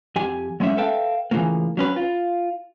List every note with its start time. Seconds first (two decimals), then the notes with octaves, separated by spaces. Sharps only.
0.16 F2 G4 G#5
0.60 F#3 G#3 A3 C#4 E5
0.77 A4 B4 E5 F5 G5 A5
1.31 C#3 E3 F3 A3 A#3
1.77 F#3 C#4 B4
1.96 F4